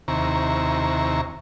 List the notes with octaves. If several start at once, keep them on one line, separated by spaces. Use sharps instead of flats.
D#2 C3 E4 A#5 C#6